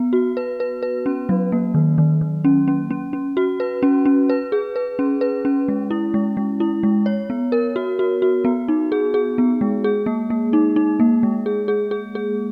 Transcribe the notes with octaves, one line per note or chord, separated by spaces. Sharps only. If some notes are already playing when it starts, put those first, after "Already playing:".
Already playing: B3
F#4
B4
B4
B4
C#4
F#3
A#3
D#3
D#3
D#3
C#4
C#4
C#4
C#4
F#4
B4
C#4
C#4
B4
G#4
B4
C#4
B4
C#4
G#3
E4
G#3
G#3
E4
G#3
C#5
B3
A#4
F#4
F#4
F#4
B3
D#4
G#4
G#4
B3
G#3
G#4
A#3
A#3
D#4
D#4
A#3
G#3
G#4
G#4
G#4
G#4